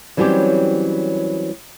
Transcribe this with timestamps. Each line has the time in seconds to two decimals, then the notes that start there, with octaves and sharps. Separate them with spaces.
0.17 E3 F#3 G3 C4 C#4 G4